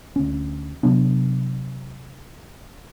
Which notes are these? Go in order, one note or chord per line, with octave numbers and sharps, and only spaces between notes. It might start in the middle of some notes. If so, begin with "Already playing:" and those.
D2 C#4
C3 F#3 B3 D4